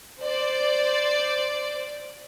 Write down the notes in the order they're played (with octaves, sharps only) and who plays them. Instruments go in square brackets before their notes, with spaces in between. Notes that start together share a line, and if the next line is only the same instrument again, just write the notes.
[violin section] C5 D5